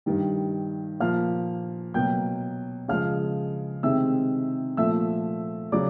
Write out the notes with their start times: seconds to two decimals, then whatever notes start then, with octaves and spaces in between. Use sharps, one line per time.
0.06 G2 D#3 G3
1.00 A#2 F3 A#3 F5 F6
1.94 B2 F#3 A#3 G5 G6
2.88 C#3 F3 G#3 F5 F6
3.83 C3 D#3 G#3 C4 E5 E6
4.77 A#2 F3 A3 E5 E6
5.72 C#3 F#3 D5 D6